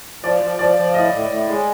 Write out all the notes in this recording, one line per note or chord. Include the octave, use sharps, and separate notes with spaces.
F3 D5
F3
F3 D5
F3
A2 D#5
A2
A2
G#3